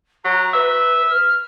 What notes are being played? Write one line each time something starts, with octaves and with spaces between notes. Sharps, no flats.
F#3 A#5
B4 E5
F6